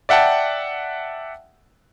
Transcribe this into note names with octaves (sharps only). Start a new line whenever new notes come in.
D5 E5 F#5 G5 A5